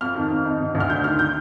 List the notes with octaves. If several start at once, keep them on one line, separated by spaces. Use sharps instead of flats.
F2 F6
D#3
F2
D#4
D3
D2
F6
D4 G6
D#3 F6
G6